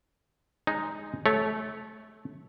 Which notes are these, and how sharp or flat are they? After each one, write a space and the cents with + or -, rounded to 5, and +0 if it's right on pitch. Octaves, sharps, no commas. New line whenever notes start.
G#3 +0 D#4 +0
A3 -20 C#5 +0